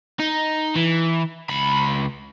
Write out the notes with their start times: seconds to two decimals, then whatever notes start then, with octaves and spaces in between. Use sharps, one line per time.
0.20 D#4
0.76 E3
1.49 C#2 B5